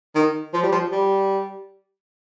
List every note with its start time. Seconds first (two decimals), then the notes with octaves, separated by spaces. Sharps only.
0.16 D#3
0.54 F3
0.63 G3
0.72 F3
0.92 G3